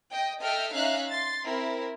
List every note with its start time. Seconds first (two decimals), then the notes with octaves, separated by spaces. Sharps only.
0.11 D#5 G5
0.41 A4 D#5 E5 G5 F6
0.73 C#4 D#4 E5 F5 F#6
1.09 C6 A6
1.45 C4 E4 A#4